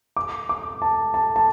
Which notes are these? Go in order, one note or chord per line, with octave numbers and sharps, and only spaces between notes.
D6
D6
A5
A5
A5